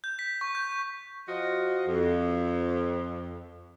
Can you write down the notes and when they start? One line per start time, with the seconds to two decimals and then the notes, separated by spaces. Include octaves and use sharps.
0.04 G6
0.19 B6
0.41 C#6
0.55 G6
1.28 F3 F4 F#4 D#5
1.88 F2